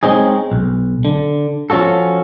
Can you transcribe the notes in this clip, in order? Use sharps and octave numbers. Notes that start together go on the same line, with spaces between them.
G#3 C4 C#4 D#4 G#4
B1
D3
F3 C#4 F4 F#4 A4